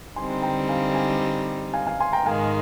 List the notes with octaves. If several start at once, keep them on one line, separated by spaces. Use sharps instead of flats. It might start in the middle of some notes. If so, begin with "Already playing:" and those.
D3 G3 C4 D#4 G#5 C6
G5 A#5
F5 G#5
F5 G#5
F5 G#5
F5 G#5
G#5 C6
G5 A#5
G#2 D#3 G#3 F5 G#5